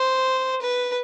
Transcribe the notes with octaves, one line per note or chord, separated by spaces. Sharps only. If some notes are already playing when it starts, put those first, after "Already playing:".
Already playing: C5
B4